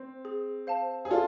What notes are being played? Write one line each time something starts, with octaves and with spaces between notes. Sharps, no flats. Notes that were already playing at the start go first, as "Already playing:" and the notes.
Already playing: C4
G#4
C5 F5 A5
G#4
F4 A4 D5